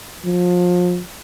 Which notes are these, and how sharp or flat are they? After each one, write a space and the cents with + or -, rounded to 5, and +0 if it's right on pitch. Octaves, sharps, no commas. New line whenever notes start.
F3 +30